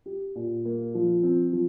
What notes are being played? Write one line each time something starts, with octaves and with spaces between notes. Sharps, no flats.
G4
A#2
A#3
F3
C4
F3